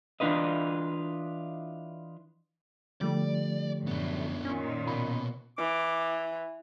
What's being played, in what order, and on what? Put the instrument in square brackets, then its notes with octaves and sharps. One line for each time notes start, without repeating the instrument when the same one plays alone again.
[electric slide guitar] E3 D4 F4 B4 D#5
[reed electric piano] D3 F3 A3 [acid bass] G3 [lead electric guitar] D5
[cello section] F#2 A2 [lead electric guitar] B3 D4
[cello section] A#2 D#3 [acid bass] C#4
[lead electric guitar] B2 [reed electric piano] B5
[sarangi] E3 [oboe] D6